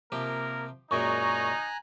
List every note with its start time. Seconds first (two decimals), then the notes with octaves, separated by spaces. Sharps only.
0.12 C3 F3 A#3 G4 A#4
0.91 F#2 A#2 G#3 D#4 G#5 A#5 C#6 F#6